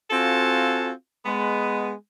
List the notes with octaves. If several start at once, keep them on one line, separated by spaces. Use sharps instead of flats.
C4 F4 F#4 A4 F5 G#5
G#3 B3